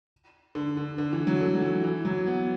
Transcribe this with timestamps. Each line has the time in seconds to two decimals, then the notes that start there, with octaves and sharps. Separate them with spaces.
0.55 D3
0.77 D3
0.98 D3
1.13 E3
1.27 F#3
1.41 A3
1.55 F#3
1.62 E3
1.84 E3
2.05 F#3
2.27 B3